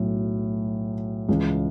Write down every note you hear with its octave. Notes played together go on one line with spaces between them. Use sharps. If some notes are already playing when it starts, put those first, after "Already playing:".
Already playing: B1 A2 F#3
C#2 C#3 E3